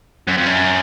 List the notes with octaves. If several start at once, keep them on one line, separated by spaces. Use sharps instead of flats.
F#2
F2
F#2